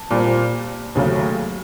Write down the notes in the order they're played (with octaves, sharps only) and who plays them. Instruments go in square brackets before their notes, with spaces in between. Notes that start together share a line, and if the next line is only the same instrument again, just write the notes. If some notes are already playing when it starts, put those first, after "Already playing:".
Already playing: [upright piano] A5
A#2 G3 C4
D#2 C#3 F#3 A3